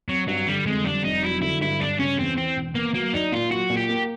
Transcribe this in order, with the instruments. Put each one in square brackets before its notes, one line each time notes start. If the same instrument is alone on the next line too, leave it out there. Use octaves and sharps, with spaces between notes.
[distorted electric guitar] F#3 [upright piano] C4
[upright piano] G2 [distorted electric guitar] F#3
[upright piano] D3 [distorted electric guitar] G3
[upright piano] F2 [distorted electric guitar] G#3
[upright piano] G3 [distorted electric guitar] D4
[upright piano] F1 [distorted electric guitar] D#4
[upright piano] F#3 [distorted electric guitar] E4
[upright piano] D3 [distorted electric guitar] E4
[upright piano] G2 [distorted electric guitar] E4
[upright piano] G2 [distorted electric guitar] D4
[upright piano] C#3 [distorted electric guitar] C#4
[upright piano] E2 [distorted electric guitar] C4
[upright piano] E3 [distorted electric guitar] C4
[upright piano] E1
[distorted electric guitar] A#3 [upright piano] B3
[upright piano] F#3 [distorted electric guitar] A#3
[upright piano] D4 [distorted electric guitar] D#4
[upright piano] A#2 [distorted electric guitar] F4
[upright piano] F#3 [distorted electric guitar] F#4
[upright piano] A#2
[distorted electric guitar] G4
[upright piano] A#3